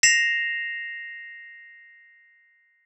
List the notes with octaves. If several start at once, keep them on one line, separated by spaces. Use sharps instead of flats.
A#6 C7 E7 F7